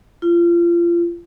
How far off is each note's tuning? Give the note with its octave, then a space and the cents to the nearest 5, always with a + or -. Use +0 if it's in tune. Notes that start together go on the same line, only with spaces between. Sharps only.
F4 -30